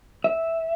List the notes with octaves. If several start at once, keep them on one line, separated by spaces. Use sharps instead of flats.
E5